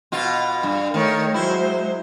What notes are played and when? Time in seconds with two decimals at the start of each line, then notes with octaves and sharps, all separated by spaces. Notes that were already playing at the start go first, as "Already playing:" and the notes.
0.12 B2 F4
0.63 G2
0.94 D#3 A3 A#4 C#5
1.34 F#3 G#3 E4 C5